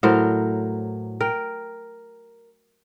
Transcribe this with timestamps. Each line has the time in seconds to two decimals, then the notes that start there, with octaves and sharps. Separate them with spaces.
0.03 A2 F#3 A#4 C5
1.21 A#4 G5